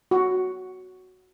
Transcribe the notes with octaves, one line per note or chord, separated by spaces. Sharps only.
F#4